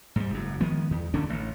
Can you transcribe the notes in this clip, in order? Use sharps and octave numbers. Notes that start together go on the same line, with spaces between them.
G#2 G3
F#1 F#2
D#3 F3 G#3 B3
E2
D1 D3 C#4 D4
A1